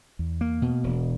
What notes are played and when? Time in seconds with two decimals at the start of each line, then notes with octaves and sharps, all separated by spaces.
0.19 E2
0.41 A#3
0.62 B2
0.84 E1